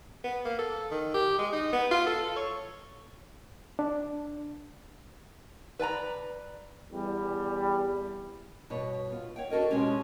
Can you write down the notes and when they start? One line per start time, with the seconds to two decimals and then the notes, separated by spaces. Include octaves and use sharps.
0.24 B3
0.45 A#3
0.59 A4
0.91 D#3
1.14 G4
1.39 G#3
1.53 D#4
1.73 B3
1.91 F4
2.07 A4
2.36 C#5
3.79 D4
5.79 B4 D5 G#5 A#5
6.92 E2 G3
8.70 G2 B2 B4 C#5
9.12 B3 F4
9.36 C#5 F#5 G5
9.50 D4 F#4 A4 A#4 D#5
9.70 B2 F3 G#3 C4 C#4 G4